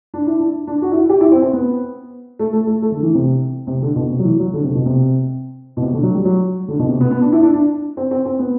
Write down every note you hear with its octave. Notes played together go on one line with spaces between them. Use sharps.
D4
E4
D4
D4
F#4
E4
F#4
G4
E4
C4
C4
B3
A3
A3
A3
A3
D3
E3
C3
C3
D3
B2
C3
F#3
E3
F#3
D3
C3
B2
C3
B2
C3
D3
F#3
G3
F#3
D3
B2
C3
B3
B3
D4
E4
D4
D4
C4
C4
C4
B3